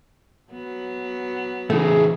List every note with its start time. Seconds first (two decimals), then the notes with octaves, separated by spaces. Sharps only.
0.52 F#3 B3
1.70 C#3 E3 A3 C4 E4 G#4